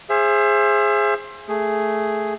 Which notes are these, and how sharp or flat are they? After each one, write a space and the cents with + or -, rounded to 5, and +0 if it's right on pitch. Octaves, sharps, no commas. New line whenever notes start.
G#4 -5 C5 +20 E5 +30
A3 +0 G#4 +0